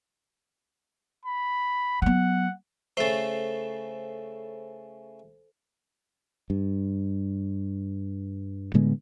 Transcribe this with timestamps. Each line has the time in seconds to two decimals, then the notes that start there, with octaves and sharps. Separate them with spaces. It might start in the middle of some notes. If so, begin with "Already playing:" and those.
1.25 B5
2.02 F#3 B3 F#5
2.97 C#3 A3 A4 C5
6.50 G2
8.74 A2 D3 G#3 B3